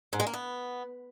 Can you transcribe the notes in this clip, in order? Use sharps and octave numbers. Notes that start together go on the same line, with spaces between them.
G#2
G#3
A#3
B3